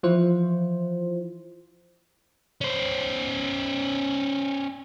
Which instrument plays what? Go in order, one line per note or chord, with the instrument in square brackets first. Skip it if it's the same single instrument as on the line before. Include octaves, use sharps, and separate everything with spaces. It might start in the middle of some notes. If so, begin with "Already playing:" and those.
[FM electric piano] E3 F3 E4 F4 C5
[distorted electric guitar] C#4 C5